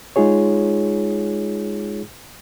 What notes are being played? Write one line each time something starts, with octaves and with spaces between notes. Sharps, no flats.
G#3 D#4 F4 G#4 C#5